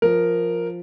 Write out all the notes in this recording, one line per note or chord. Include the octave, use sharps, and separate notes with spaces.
F3 A#4